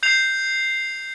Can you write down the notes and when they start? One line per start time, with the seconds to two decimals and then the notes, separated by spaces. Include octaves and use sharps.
0.03 G6 C7 F7